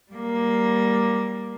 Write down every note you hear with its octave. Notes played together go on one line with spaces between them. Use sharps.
G3 A#3